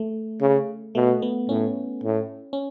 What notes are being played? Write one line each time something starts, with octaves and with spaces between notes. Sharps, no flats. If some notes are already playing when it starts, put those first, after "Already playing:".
Already playing: A3
C#3
B2 A3
B3
A2 C#4
A2
C#4